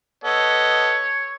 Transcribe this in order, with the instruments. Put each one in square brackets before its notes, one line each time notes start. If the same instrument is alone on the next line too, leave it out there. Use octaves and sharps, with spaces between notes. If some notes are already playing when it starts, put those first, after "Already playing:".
[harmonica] B3 A4 D#5 [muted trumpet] C#5